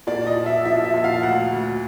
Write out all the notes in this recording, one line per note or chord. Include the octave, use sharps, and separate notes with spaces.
A#2 D5
D#5
F3
E5
F3 E5
E5
A#2
F5
D2 F#5
D2